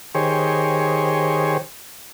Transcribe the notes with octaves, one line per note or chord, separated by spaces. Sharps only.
D#3 G4 G#4 C5 C#5